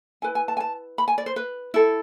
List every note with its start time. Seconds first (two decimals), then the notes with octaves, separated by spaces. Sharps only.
0.22 E4 B4 G#5
0.35 G#5
0.48 A5
0.57 G#5
0.60 A5
0.98 B5
1.08 G#5
1.18 D5
1.26 C5
1.36 B4
1.74 E4 A4